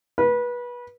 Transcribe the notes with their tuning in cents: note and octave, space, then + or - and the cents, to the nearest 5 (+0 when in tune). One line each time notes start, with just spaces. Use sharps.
B4 -25